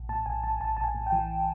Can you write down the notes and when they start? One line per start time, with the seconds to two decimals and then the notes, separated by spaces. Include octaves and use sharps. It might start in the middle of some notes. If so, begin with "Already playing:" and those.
Already playing: A#1
0.09 A2 A5
0.26 A#1 G#5
0.44 A#1 A5
0.60 A#1 A5
0.77 A#1 A5
0.84 G#5
0.95 A2
1.06 G5
1.12 E3